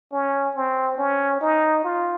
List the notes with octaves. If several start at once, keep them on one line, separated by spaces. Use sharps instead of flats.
C#4
C4
C#4
D#4
F4